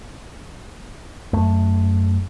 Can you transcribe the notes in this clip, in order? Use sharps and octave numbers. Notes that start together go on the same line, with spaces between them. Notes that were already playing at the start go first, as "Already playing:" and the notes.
F#2 A3